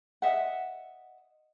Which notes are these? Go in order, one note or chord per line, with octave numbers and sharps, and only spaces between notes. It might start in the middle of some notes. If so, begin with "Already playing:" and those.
D#5 E5 F#5